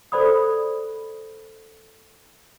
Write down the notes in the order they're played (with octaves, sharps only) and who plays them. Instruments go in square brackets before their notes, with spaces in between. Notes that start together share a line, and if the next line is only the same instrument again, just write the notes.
[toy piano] A4 C5 D5 B5 D#6